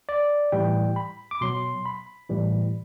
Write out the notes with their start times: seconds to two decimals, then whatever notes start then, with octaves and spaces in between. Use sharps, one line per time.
0.09 D5
0.52 A2 E3 G3 G5
0.96 B5
1.31 D6
1.41 B2 F#3 C6
1.86 B5
2.30 A2 E3 G3